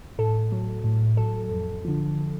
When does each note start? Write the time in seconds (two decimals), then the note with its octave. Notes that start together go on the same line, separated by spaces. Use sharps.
0.18 A2 A4
0.52 F#3
0.84 A2
1.17 F#3 A4
1.51 F2
1.85 D3 F3